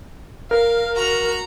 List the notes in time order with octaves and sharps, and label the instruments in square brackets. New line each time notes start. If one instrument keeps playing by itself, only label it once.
[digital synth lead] A#4 [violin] F5
[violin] F#4 A#5